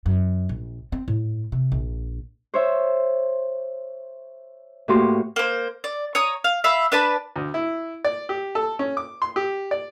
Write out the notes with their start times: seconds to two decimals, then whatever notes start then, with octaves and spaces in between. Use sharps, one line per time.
0.06 F#2
0.49 A#1
0.92 C4
1.08 A2
1.52 C3
1.72 A#1
2.54 C5 C#5 E5
4.88 A2 A#3 F#4 G4 C6 C#6
5.36 A#3 C5
5.84 D5
6.15 C#5 A#5 D#6
6.44 F5
6.64 E5 F5 B5
6.92 D4 B4 A5 B5
7.36 D2
7.54 E4
8.05 D5
8.29 G4
8.55 A4
8.79 C#4
8.97 D6
9.22 C6
9.36 G4
9.71 D5